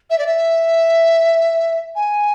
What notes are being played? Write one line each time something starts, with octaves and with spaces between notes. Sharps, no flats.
E5
D5
E5
G#5